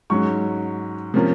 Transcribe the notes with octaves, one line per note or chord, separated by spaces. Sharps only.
G#2 F#3 C#4 C#6
C3 F3 A#3 C#4